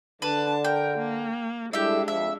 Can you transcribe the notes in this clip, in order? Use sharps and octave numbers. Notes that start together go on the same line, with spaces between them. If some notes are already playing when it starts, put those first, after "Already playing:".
D3 D4 B4 A5
A#4 G5
A#3
G3 G#3 D4 E4 G4 A4 E5
F2 E5